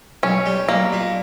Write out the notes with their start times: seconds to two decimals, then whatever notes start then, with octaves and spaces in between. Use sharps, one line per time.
0.23 B1 C#4
0.46 G3
0.69 B1 A#3
0.93 A#2